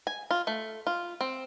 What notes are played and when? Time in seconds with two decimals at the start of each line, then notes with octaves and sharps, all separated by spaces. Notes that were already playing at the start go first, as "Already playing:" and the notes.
0.07 G#5
0.31 F4
0.47 A3
0.87 F4
1.21 C4